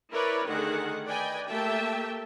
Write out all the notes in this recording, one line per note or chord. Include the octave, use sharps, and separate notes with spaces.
E4 A#4 B4 C#5 D5
D3 D#3 A3 G#4 F#5
B4 D5 D#5 G5 G#5
A3 A#3 G4 E5 G5 A5